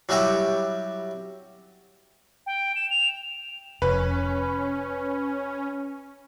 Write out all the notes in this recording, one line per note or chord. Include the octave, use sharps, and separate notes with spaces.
F#3 G3 E4 F#4 G4
G5
E7
F7
F1 C#4 B4